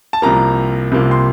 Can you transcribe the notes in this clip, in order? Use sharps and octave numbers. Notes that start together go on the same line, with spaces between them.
A5
C2 C3 F3 A#3 A#5
C2 C3 F3 A#3
C6